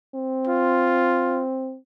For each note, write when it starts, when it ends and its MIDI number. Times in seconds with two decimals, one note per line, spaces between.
0.14 1.77 60
0.47 1.43 65